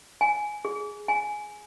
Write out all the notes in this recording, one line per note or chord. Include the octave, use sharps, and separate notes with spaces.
G#5
G#4
G#5